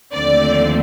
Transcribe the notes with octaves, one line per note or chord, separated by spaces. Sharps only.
D#2 D3 F3 A3 C4 D5